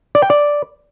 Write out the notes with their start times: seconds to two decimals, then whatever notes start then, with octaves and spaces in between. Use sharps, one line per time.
0.15 D5
0.22 G5
0.30 D5